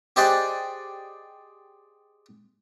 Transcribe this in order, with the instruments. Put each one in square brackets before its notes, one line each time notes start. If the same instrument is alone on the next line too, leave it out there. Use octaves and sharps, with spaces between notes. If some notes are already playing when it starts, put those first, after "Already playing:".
[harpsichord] G4 G#4 C5 D5 D#5 F#5